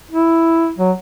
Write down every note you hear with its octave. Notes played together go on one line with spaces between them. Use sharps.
E4
F#3